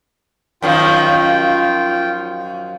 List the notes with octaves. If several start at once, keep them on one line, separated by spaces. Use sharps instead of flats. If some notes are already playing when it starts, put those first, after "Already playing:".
F#2 D#3 F3 F4 G5